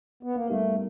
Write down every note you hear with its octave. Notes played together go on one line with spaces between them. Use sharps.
B3
A#3
G3 A3 B3 D#4 G4 A#4